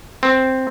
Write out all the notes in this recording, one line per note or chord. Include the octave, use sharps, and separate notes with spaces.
C4